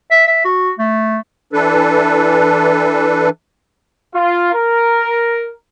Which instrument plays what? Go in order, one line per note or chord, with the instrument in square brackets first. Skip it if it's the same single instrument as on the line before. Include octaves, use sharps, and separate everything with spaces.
[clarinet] E5
E5
F#4
A3
[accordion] E3 D4 A4 B4
[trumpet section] F4
A#4